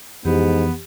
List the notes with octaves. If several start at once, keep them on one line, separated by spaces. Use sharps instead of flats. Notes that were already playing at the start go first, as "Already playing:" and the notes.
F2 G#2 E3 B3 G4